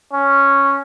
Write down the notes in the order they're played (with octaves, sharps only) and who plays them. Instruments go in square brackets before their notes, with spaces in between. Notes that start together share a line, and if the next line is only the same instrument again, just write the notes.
[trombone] C#4